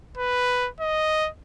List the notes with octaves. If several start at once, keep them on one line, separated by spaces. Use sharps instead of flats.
B4
D#5